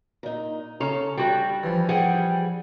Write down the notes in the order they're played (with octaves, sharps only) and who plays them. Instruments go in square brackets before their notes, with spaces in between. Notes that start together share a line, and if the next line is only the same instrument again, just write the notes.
[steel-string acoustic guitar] A#2 D#4
[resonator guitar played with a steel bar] C#3 C#5 A#5 [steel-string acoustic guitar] A4
[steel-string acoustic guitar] D2 G5 [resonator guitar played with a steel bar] G3 F#4
[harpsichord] E3 F3
[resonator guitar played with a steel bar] G3 [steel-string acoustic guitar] G#4 F#5 G5